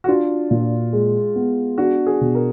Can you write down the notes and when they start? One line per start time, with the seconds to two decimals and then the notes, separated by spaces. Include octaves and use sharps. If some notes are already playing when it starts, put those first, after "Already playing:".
0.04 F#4
0.08 D4 F4
0.51 A#2
0.93 G#3
1.36 B3
1.78 D4 F#4
2.07 G#4
2.21 B2
2.35 A#4